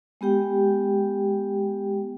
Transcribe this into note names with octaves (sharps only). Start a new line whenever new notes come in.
G#3 B3 G4 G5